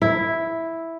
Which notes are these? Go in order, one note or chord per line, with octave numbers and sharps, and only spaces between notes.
E4